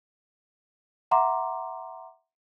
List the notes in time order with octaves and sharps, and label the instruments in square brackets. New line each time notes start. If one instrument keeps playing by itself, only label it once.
[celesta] E5 F#5 A#5 C6 D6